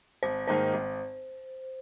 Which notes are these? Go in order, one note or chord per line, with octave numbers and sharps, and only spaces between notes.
G#1 C5
G#2 D#3 A#3 D#4 C5
G#1